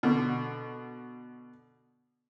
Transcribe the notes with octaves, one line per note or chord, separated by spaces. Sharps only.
B2 D3